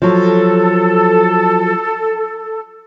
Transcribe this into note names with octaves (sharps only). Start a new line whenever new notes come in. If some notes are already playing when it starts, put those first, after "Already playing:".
F3 F#3 A4